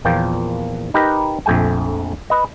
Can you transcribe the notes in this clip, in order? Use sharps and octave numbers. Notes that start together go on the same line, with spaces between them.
E2 A#2 F3 A#3 G5
D#4 G4 A#4 B4 D#5
A#1 F2 A3 G5 G#5
B4 D#5